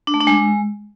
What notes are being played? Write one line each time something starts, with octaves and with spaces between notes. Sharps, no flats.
D4
A3
D4
G#3